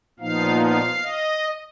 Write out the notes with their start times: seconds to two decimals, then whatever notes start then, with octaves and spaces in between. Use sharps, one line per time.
0.19 A#2 F3 B3 D#4 F5
0.61 F5
1.02 D#5